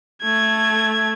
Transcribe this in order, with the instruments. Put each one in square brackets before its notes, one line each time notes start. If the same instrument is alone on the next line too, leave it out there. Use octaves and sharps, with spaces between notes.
[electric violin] A3 G#6